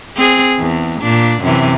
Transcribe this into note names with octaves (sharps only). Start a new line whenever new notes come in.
C4 G#4
E2
A#2 D4
F#2 C3 E3